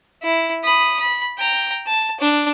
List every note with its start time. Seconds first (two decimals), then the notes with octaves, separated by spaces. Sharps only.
0.23 E4
0.64 B5 D#6
1.00 B5
1.38 G5 A#5
1.87 A5
2.20 D4